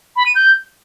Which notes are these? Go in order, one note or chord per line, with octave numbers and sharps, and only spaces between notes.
B5
D#7
G6